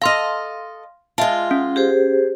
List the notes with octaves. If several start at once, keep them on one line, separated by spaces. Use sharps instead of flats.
A4 D#5 F5 C6 F6
G#3 F4 E5 A5
C#4
G4 G#4 C5